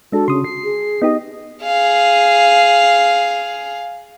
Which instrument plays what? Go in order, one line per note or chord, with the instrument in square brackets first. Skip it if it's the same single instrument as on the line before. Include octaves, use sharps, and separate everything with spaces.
[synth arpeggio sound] G#3 D4 [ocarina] F#4 [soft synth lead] A4
[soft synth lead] C#3 [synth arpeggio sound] C6 D#6
[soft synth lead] C7
[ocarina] G#4
[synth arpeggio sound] B3 D#4 G4 [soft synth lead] D#5
[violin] G#4 F5